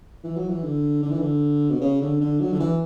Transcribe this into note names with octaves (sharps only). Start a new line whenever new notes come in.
E3
F#3
E3
D3
D3
E3
D3
B2
C#3
D3
D3
F#3
D3
E3